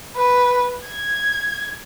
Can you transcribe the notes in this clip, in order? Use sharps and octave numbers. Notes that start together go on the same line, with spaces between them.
B4
G#6